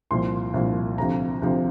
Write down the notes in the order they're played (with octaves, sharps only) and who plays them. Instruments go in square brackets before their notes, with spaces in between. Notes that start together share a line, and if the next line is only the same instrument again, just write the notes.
[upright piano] C2 A#2 F3 C6
C2 A#2 F3
D2 C3 F3 A#5
D2 C3 F3